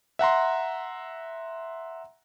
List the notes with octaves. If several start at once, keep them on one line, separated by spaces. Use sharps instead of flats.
E5 F#5 A#5 C6